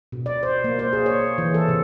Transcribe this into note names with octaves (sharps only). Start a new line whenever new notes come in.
B2
D5
C5
A#3
C5
G#4
C#5
E3
A4
C3